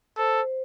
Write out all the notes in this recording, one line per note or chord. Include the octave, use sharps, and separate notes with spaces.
A4 C5